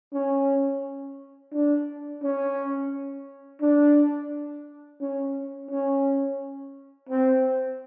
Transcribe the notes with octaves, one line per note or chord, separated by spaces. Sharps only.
C#4
D4
C#4
D4
C#4
C#4
C4